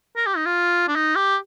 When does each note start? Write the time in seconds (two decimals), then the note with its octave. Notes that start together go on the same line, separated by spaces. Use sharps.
0.16 A#4
0.26 G4
0.37 D#4
0.46 F4
0.88 D4
0.96 D#4
1.15 G4